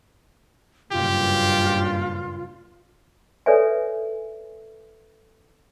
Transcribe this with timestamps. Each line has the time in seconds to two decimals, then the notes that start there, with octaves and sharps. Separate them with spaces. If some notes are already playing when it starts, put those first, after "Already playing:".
0.92 F#1 G2 A#2 F4 G4
3.46 A4 B4 C#5 D5 E5 G#5